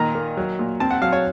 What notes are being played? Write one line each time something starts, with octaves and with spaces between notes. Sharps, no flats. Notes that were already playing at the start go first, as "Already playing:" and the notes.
Already playing: A#2 D#3 A#5
A#3
F#3
A#2
C4 A5
F#5
F#3 F5
C#5